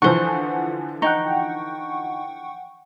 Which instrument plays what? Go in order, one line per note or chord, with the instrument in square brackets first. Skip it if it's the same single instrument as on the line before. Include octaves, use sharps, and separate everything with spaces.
[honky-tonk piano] D3 E3 F3 [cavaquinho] C5 C#6 [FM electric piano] F#5
[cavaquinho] D#4 [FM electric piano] F#5 G5 C#6